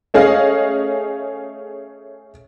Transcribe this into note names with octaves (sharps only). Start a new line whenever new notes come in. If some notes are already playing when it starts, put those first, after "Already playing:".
A3 C#4 G#4 D#5 F5